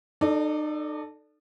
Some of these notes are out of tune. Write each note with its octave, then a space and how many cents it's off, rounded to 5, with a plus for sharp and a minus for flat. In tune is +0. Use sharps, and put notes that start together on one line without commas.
D#4 -40 A4 +0 D5 +0